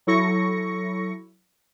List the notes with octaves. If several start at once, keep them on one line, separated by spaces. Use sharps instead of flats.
F#3 E4 A4 C#6 A#6 C#7